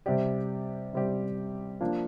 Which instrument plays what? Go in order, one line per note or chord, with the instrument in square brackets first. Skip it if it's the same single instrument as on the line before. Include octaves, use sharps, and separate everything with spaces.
[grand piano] C3 G3 C4 G4 D5
C3 G3 C4 G4 D5
F3 A#3 D4